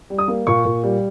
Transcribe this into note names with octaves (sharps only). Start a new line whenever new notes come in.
G3
D#6
A#3
A#2 C#6
A#2
G3